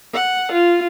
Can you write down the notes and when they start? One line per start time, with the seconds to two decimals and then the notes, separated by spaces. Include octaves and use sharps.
0.14 F#5
0.52 F4